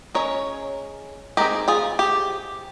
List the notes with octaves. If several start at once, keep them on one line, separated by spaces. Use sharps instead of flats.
G#3 C#4 A#4 C#5
G#3 C4 D#4 G4 A#4
F4 G#4
G4